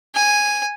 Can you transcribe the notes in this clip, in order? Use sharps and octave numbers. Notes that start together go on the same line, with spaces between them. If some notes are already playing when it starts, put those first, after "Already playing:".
G#5